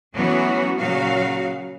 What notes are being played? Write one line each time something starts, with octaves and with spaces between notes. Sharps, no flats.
E3 F#3 A3 B3 C#4 F#4
A#2 C#3 F#3 F#4 F5